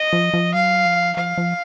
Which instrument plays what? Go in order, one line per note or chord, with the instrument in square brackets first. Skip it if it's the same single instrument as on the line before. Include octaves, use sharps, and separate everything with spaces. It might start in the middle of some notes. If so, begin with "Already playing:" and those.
Already playing: [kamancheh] D#5
[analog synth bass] F3
F3
[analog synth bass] F#3 [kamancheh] F5
[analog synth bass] F3
[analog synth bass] F3 [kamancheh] F5
[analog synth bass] F3